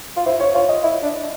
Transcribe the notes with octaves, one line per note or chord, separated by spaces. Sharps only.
F4
E4 C5
C#5
F4 C#5
D#5
E4
D4